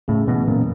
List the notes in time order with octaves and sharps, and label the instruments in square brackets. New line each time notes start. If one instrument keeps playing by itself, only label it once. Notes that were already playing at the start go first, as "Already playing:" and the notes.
[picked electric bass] A2 [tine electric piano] C#3
[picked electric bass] B2 [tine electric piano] E3
[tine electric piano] F#2 [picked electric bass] A#2